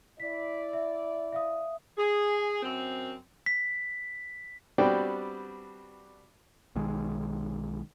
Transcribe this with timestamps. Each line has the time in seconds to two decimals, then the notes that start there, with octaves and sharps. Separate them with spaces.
0.20 E4 D5 B6
0.73 E5
1.32 E5 F5 D#6
1.97 G#4
2.62 F#2 C4
3.46 B6
4.78 G3 B3 C4 D4 F#4 G5
6.76 B1 D#3 G#3